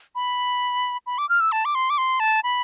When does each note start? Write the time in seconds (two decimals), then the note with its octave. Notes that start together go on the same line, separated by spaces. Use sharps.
0.15 B5
1.06 B5
1.18 D6
1.29 F6
1.40 E6
1.52 A5
1.65 D6
1.75 C6
1.90 D6
1.98 C6
2.20 A5
2.44 B5